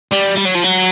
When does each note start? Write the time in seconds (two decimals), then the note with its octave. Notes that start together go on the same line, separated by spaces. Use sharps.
0.11 G3
0.36 G3
0.45 F#3
0.54 F3
0.63 F#3